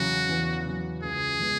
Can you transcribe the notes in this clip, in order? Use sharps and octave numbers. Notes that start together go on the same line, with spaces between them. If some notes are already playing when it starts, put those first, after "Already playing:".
Already playing: E2 C#3 F#3 F#4
E2
C#3 F#3
C#2 G#4
C#3 G#3 B3